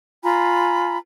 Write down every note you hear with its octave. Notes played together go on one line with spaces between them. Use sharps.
F4 G#5 A#5 B5